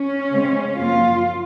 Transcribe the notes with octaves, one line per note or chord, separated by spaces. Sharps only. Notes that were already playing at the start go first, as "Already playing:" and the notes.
Already playing: C#4
C#3 G#3 C4
F#2 F3 A#3 F4